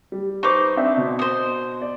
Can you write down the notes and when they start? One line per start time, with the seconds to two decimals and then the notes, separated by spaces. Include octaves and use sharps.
0.12 G3
0.43 D#4 B4 C5 C#6 D6
0.77 C4 D4 E5
0.97 B2
1.19 C5 D#5
1.81 D5